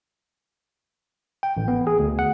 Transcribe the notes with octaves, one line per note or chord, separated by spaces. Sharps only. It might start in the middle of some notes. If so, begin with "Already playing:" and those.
G5
A1
B3
G#4
D2
F#5